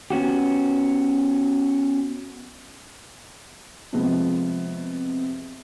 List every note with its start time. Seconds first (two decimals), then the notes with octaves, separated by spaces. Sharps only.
0.10 B3 C#4 F#4 G4
3.93 C3 F3 G#3 B3